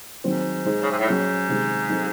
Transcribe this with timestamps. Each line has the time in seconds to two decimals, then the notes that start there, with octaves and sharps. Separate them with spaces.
0.24 G#2 D#3 F#3 C4
0.65 G#3 D#4 G#4 C5
0.82 C#3
0.90 C3
0.99 A2
1.07 G#2 F#3 C#4 G#4 C#5
1.48 C3 D#3 G#3
1.89 F#3 C4 D#4 A4